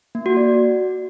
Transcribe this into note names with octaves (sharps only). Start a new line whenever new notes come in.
A#3
F#4
D5